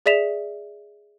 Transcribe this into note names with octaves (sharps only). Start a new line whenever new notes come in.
G#4 D5 E5 B6 E7 F7